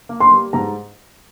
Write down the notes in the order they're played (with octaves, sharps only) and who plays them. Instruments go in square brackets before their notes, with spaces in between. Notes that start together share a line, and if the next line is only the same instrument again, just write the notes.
[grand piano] A#3
[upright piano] C6
[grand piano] G3
[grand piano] G#2 [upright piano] A#5